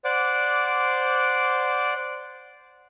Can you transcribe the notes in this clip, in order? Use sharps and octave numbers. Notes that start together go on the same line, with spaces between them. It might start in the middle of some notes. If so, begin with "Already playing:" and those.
C5 D5 F#5 D6